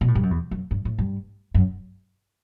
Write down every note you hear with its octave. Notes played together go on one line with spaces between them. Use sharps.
B2
A2
G2
F#2
E2
F#2
G2
A2
G2
F#2